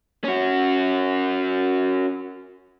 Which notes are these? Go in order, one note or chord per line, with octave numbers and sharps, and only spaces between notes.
C#4 F#4